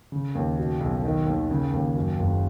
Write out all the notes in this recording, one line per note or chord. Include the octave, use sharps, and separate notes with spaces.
C#3
D#2
B2
B1
D#3
D#2
C#3
D#2
F#2
F#1